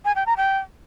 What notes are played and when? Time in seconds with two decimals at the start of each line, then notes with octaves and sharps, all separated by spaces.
0.05 G#5
0.16 G5
0.26 A#5
0.37 G5